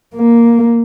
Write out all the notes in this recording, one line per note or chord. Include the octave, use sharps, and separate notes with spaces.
A#3